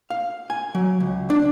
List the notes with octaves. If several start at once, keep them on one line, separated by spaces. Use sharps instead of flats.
F5
G#5
F#3
C#2
D4